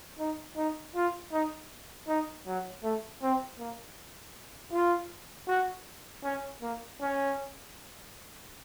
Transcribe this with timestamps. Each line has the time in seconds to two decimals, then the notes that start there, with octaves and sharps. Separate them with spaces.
0.19 D#4
0.57 D#4
0.95 F4
1.32 D#4
2.08 D#4
2.47 F#3
2.83 A3
3.22 C4
3.59 A#3
4.72 F4
5.48 F#4
6.24 C#4
6.62 A#3
7.01 C#4